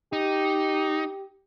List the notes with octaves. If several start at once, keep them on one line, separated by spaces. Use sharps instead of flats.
D#4 G4